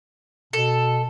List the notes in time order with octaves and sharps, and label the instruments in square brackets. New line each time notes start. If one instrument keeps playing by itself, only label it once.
[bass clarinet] B2 [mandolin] A4